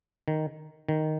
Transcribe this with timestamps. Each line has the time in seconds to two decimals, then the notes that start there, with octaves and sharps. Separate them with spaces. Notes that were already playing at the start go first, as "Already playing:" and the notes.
0.28 D#3
0.89 D#3